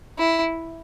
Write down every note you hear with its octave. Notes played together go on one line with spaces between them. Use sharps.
E4